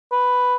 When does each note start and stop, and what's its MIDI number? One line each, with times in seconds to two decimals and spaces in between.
0.12 0.56 71